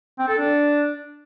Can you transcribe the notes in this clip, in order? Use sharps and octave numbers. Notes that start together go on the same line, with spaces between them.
C4
A4
D4